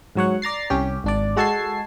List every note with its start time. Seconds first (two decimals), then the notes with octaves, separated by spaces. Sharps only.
0.15 G#2 F#3 C#5 F#5
0.42 D5 A#5 A6 C7
0.70 C2 C#4 G4
1.04 G#1 D4 D5
1.36 G#3 F#4 A4 A5 G#6 C7